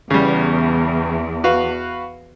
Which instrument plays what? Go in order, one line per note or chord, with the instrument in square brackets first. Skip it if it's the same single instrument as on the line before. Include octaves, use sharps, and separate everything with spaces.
[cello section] E2 [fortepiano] C#3 G3
[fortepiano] F#4 B4 F5